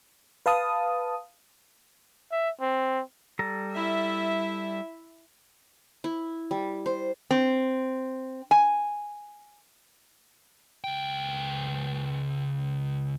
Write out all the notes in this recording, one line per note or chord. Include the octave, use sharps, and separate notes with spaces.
B4 F5 A5 D#6
E5
C4
G3 A4 A#5
E4 E5
E4
G3
C5
C4
G#5
C#2 G5